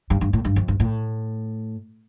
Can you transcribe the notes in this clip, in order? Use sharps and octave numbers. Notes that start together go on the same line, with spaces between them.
G2
G2
A2
G2
F2
G2
A2